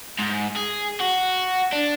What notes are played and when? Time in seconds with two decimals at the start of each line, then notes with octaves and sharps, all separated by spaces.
0.19 G#2
0.57 G#4
1.01 F#4
1.73 D4